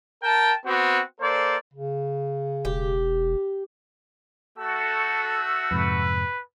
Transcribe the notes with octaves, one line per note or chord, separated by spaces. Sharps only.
A#4 G5 A5
B3 C4 F#4
A#3 A4 C5 D5
C#3
E1 G4
A3 F#4 A4 E6
F2 G#2 C3 B4